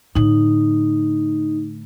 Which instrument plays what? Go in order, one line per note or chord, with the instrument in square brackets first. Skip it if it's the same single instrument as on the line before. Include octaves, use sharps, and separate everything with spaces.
[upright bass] A2 D3 [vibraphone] D#4